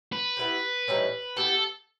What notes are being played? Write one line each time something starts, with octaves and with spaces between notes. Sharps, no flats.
B4
B3 E4 G4
A2 E3 G3 D#4
B3 E4 G4 A4